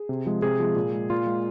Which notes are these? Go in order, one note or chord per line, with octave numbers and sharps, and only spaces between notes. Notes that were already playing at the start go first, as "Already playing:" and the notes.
Already playing: G#4
C3
F3 G#3
C3 G#4
F3 G#3
A#2
G#3
A#2 F4
G#3